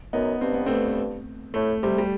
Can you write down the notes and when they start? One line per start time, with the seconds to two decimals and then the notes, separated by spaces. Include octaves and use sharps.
0.13 F#2 B3 D#4
0.41 G2 C4
0.54 B3
0.66 A3 C4
1.54 A2 A3
1.82 C3 G3
1.98 G3